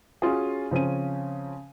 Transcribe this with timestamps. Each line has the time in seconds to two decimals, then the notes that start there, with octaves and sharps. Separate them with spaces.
0.22 C#4 F4 F#4 G#4
0.71 C#3 F3 C4 C#4 D#7